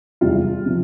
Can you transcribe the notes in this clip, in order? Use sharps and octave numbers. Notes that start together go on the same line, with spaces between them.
E2 C3 E3 G3 F4
C3 F3